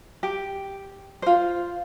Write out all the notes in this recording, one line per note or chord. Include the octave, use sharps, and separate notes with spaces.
G4
F4 C5